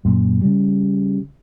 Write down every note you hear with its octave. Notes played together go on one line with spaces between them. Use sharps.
F#2 A#2
C#3 G3